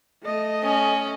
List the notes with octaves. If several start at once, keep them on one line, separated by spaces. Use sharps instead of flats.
A3 D#5
C#4